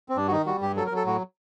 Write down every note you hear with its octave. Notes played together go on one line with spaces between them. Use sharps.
C4
G2 D4
F#4
D#3 D#4
G3 F#4
G2 G4
F#3 A4
A#4
F#3
A4
A2 F#4